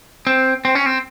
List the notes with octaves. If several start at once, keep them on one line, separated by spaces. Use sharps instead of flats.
C4
C4
C#4
C4